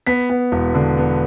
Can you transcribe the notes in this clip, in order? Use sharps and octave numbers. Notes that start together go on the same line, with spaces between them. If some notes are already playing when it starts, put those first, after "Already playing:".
B3 B6
B3
E1
D3
B3